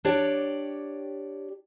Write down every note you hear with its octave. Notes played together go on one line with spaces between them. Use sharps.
D4 G4 C#5 D5 G5